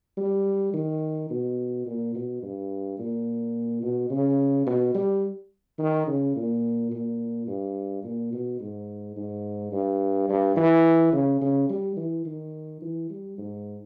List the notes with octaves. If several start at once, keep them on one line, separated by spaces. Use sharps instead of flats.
G3
D#3
B2
A#2
B2
G2
A#2
B2
C#3
B2
G3
D#3
C#3
A#2
A#2
G2
A#2
B2
G#2
G#2
G2
G2
E3
C#3
C#3
G3
E3
D#3
E3
G3
G#2